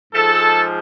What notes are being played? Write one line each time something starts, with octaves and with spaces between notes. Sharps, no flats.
G#2 F3 G#3 A4